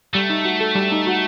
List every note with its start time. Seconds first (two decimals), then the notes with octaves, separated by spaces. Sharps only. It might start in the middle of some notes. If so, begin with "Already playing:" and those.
0.14 G3 A3
0.30 D#4
0.45 F#4
0.60 A4
0.75 G3
0.92 D#4
1.07 F#4